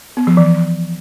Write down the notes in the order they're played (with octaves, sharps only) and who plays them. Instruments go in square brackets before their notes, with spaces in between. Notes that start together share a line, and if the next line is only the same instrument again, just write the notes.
[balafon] B3
F3
E3